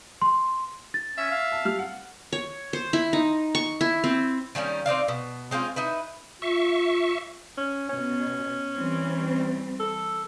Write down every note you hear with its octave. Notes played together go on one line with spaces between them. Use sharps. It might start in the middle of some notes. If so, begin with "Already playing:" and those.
C6
A6
C#4 E5
F5
A5
G3 F6
F#5
C#5
C5
E4
D#4
C#6
E4
C4
D#3 G3 A#3 C#4
C4 D#4 D5 F5
B2
G#3 C4 C#4 F4
D#4 E4 B4
F4 E5 C#6
C#4
B2 C#4
E3 G3 C4
A4